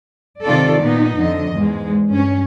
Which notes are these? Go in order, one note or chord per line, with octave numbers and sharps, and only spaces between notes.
C3 D#3 F4 A4 D5
A#2 B3 D#4
F2 D3 F3 D#5
E2 G#2 G#3
G2 C#4